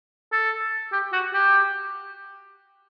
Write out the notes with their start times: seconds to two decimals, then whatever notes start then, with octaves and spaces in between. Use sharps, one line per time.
0.32 A4
0.92 G4
1.12 F#4
1.34 G4